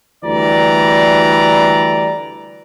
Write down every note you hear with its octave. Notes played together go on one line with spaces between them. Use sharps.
D2 E3 G3 D5 A#5